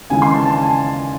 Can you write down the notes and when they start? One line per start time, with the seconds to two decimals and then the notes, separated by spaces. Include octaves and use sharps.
0.10 D#2 C#3 E3 G#3 G#5
0.22 C6
0.34 A5
0.45 A5
0.63 G#5